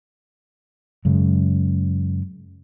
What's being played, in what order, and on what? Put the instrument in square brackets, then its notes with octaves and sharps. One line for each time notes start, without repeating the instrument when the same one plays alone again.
[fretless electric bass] F#2 C#3 G#3